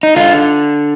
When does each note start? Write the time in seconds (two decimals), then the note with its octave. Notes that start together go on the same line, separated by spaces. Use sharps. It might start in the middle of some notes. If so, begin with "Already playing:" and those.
0.03 D#4
0.16 D3 F4